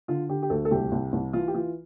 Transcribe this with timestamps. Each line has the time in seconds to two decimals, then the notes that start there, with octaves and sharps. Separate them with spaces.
0.08 D3 F4
0.29 D3 G4
0.42 G4
0.50 D2 A4
0.65 A4
0.71 C2 G4
0.92 C2
1.13 C2
1.33 E3 F4
1.48 G4
1.54 E3 F4